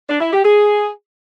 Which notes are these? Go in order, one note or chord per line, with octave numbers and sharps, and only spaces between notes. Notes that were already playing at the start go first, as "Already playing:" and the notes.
D4
E4
G4
G#4